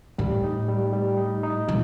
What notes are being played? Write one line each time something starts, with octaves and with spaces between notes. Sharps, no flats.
A2 G3
D#4
G3
G3
D#4
D#4
A#2 F4